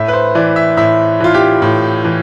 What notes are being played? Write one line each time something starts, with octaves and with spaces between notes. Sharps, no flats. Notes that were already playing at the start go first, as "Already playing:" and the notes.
Already playing: A2 E5
B4
C5
E3 D5
E5
A2 E5
E3 F4
G4
A2
E3